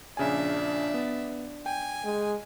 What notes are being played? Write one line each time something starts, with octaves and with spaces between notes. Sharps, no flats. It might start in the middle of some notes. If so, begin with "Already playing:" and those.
A#1 C#3 D4 E5 G#5
B3
G5 G#5
G#3